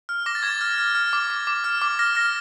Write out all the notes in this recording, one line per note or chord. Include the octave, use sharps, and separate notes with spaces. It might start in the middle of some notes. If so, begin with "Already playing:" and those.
F6
D6 A#6
A6
D6 G#6
A6
F6
F6
F6
D6
D6
D6
F6
D6
F6 A#6
F6 A#6